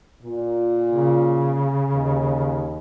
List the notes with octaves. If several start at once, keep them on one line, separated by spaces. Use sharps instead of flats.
A#2
C#3
D#2